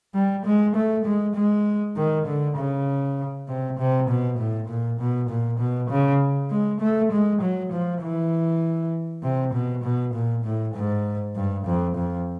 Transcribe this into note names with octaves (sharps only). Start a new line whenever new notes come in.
G3
G#3
A3
G#3
G#3
D#3
D3
C#3
C3
C3
B2
A2
A#2
B2
A#2
B2
C#3
G#3
A3
G#3
F#3
F3
E3
C3
B2
B2
A#2
A2
G#2
G2
F2
F2